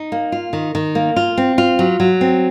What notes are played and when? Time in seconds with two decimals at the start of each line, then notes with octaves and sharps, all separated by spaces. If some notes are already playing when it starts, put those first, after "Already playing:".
Already playing: D#4
0.12 A#3
0.32 F4
0.53 D#3
0.75 D#3
0.95 A#3
1.16 F4
1.37 C4
1.58 F4
1.79 F#3
2.00 F#3
2.21 C4